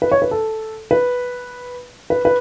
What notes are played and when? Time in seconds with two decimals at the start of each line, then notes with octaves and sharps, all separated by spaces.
0.02 B4
0.12 C#5
0.22 B4
0.31 A4
0.91 B4
2.10 B4
2.25 B4